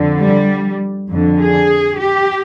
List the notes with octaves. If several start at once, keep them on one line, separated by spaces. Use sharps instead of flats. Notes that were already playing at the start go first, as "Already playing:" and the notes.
Already playing: F2 D3
G3
F2 D3
G#4
G4